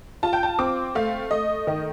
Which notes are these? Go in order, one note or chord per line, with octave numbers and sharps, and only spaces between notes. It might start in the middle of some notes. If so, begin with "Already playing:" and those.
F4 A5
G5
A5
C4 D6
A3 F5
A3 D#5
D#3 D#5